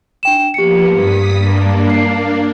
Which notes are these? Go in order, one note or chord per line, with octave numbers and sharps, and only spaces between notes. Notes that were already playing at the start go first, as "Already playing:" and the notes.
D4 G5 E7
F3 A#3 B3 G4 C#7
G2 D#6 B6
A#3 D4
C7